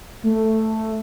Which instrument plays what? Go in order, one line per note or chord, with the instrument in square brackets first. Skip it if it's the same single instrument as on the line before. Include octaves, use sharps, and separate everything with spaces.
[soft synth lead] A3